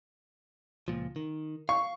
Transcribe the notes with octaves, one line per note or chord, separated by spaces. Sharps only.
C#2 A#2 F3
D#3
F5 C#6